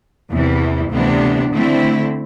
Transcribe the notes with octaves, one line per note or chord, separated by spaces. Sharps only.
E2 C3 E3
D2 C3 E3 B3 D4
D3 A3 C4 E4